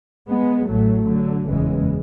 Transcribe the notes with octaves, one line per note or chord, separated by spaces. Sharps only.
G#3 B3
A1 A2 F#3 A3
D3 F#3
F#1 E2 C#3 E3 G#3